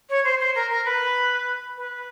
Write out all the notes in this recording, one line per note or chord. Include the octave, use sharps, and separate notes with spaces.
C#5
C5
C5
A#4
A#4
B4
B4